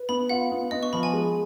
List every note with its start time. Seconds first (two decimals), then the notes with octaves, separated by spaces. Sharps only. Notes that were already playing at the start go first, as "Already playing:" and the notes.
Already playing: B4
0.09 B3 B5
0.29 F4 F#5
0.51 B3
0.71 B3 D#5
0.83 C#6
0.93 F3 B5
1.03 G#5
1.13 G#3